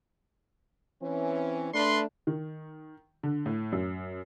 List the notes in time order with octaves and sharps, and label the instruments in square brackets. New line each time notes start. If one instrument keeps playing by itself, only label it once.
[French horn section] E3 C4 C#4
[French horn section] A3 D4 [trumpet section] B4 C6
[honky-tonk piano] D#3
D3
A2
F#2